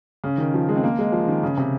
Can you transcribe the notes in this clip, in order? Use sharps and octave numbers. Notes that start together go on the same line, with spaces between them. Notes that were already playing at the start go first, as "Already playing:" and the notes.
C#3
D#3
F3
G#3
C4
A#3
G#3
F3
D#3
C#3
C3